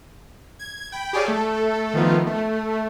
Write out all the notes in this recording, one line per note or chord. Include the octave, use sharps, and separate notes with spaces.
G#6
G5 B5
G4 G#4 C#5 D5 F5
A3 A4
D#3 F3 A3 B3 F4
A3